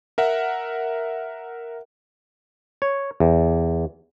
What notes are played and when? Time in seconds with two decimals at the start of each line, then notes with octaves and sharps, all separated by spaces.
0.18 A#4 E5 F#5
2.82 C#5
3.20 E2